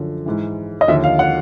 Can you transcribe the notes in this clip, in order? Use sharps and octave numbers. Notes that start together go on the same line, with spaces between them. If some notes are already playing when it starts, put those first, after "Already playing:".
Already playing: F#2 D3 F3
G#2 E3
D#5
D#2 D3 F3 E5
F5
F#5